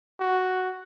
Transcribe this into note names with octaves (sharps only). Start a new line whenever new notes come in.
F#4